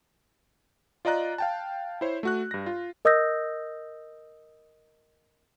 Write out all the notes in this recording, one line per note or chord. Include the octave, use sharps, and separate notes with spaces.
F4 D5 D#5 A#5 F#6
F5 G5 A5
E4 C5 C#5
A3 F#4 F#6
G2 A#6
F4
A#4 D#5 D#6 E6 G6 A#6